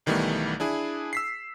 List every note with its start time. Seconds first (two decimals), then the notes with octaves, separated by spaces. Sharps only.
0.06 B1 D#3 E3 G3 A3 B3
0.60 D4 E4 G#4
1.13 E6 B6 C7